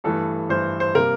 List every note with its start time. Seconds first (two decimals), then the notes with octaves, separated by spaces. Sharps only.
0.04 G2 E3 A3 A4
0.49 G2 E3 A3 C5
0.80 C5
0.95 C3 G3 A#3 A#4